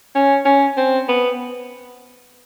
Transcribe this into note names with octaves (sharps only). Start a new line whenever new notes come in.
C#4
C#4
C4
B3